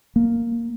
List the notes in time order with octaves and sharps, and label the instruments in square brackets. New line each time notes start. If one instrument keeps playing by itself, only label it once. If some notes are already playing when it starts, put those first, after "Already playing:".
[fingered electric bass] A#3